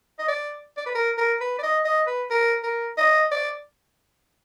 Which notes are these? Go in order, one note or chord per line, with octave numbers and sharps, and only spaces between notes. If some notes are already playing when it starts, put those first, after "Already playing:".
D#5
D5
D5
B4
A#4
A#4
B4
D5
D#5
D#5
B4
A#4
A#4
D#5
D5